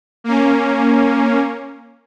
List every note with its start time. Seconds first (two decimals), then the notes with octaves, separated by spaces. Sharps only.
0.24 A#3 C#4